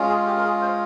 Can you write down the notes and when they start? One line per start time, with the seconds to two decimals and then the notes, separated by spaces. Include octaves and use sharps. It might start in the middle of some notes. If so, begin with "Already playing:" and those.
Already playing: G#3 C#4 F4
0.09 G#4
0.26 G4
0.37 A#4
0.44 G#4
0.62 C5